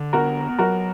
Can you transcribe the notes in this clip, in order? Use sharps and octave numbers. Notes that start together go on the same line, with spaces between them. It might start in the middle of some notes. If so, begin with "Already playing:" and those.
Already playing: D3
B3 F#4 A#4
F#3 F#4 A#4